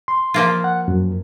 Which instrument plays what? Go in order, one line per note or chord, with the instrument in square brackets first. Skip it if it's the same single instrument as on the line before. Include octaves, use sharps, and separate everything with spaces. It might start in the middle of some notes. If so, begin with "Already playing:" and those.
[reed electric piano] C6
[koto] F3 A#3 F4
[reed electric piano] F#5
F#2